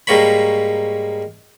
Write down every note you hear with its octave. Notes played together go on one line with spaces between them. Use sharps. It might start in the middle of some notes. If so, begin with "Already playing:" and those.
G#2 G3 A#3 C#5 B5